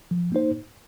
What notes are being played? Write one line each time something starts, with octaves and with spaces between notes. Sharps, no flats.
F3
A#3 D#4 C5